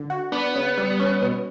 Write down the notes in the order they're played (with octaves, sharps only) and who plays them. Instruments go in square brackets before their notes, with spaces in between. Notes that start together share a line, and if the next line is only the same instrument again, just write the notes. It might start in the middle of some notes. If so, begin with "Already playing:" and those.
Already playing: [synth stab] D3
F#4
[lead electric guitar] B3 [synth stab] D4
[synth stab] C#3
G3
C#4
B2